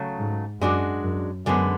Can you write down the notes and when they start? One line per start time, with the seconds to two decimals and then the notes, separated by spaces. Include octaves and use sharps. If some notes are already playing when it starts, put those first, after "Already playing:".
Already playing: C#3 F#3 A3
0.18 G#2
0.61 F#2 G#3 D4 F#4
1.04 F#2
1.46 F#2 D3 G#3 B3